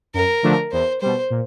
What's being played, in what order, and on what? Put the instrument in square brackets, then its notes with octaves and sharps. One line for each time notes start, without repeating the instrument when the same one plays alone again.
[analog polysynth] F#2 [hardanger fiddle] A#4
[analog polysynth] D3 F3 A3 D4
[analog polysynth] E2 [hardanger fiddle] C5
[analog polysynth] B2 G3 [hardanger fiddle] C5
[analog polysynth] A#2